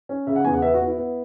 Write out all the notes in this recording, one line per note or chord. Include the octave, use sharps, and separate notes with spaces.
C#4
C#3 E5
F#5
E2 G#5
F#5
B3 E5
F#4
B3
E4
B3